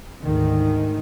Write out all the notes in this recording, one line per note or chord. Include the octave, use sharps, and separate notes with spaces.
D2 G#2 D#3